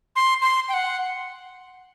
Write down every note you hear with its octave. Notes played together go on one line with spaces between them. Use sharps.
C6
C6
G5
F#5